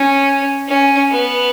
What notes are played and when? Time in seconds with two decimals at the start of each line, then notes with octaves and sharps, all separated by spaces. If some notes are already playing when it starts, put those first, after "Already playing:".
Already playing: C#4
0.68 C#4
1.12 B3